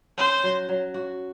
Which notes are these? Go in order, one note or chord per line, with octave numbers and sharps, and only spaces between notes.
C#4 C5
F#3
F#3
F#4